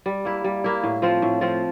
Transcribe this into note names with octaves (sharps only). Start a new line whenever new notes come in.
G3
A#3 E4
G3
A#3 E4
A2
F3 C4 F4
A2
F3 C4 F4